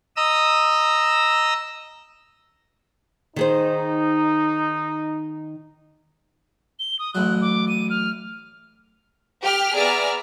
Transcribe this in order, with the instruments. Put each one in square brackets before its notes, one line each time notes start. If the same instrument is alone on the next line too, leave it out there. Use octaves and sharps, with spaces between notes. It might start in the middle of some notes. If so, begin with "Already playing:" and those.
[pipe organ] D#5 A#5 D#6 E6
[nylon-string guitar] D#3 G#4 C5 [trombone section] D#4
[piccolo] G7
D#6
[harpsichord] A1 F#3 [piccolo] F#6
[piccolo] D6
D#7
F6
[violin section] G4 F6
B3 G#4 D5 E5 A#5 F6